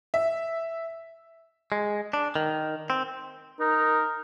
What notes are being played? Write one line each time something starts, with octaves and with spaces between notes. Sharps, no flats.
E5
G#3
D4
D#3
C4
D#4 A#4